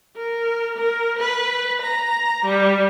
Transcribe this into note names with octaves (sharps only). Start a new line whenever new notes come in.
A#4
A#4
B4
A#5
G3